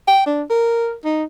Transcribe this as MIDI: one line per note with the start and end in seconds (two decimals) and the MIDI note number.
0.07 0.24 79
0.26 0.42 62
0.50 0.93 70
1.05 1.24 63